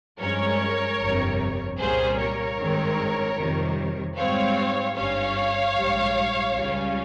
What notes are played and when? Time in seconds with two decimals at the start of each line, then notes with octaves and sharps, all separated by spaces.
0.20 G2 F3 G#3 C#4 A#4 C#5
1.00 G1 F2 C3 G3
1.79 C2 A#2 G3 A#3 C#4 G#4 C5
2.19 A#4 C#5
2.58 G#1 G2 D#3 G#3 C4
3.37 F2 C3 D#3 G3
4.17 G#2 G3 C4 C#5 F5
4.95 G1 G2 G3 C#4 C#5 F5
5.75 A#1 G#2 G3
6.54 C#2 C#3 G3 C#4